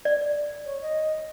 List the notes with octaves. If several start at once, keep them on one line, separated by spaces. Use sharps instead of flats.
D5
C#5
D#5